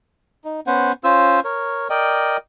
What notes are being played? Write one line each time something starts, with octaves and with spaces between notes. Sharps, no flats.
D#4
B3 C#4 C5 F#5
C#4 F4 C5 E6
A#4 C#5
A#4 D5 D#5 G5